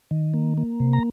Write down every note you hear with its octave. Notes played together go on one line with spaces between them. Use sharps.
D#3
A#3
A#3
C3
A#5